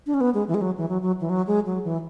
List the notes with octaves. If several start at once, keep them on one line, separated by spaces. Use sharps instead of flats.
D4
C#4
B3
G#3
E3
G#3
F#3
E3
F#3
F#3
E3
F#3
G#3
F#3
E3